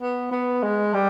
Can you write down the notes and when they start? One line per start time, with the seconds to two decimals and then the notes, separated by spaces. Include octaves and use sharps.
0.01 B3
0.31 B3
0.63 G#3
0.94 G3